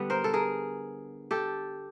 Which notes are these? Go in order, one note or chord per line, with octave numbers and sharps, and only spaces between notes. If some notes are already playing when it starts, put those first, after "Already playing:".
Already playing: D3 G3 B3
A#4 C5
A4
G#4 A#4
G4 A4